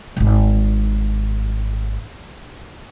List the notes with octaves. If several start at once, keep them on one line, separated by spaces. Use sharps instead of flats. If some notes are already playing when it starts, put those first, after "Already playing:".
D#1 G#1